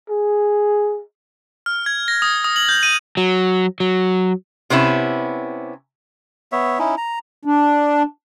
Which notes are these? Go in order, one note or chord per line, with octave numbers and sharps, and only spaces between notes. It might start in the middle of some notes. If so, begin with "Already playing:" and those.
G#4
F6
G#6
A#6
D#6
D#6
F#7
G6
D#7
F#3
F#3
C3 B3 C#4 E4
B3 C#5 E5
C#4 D#4 E4
A#5
D4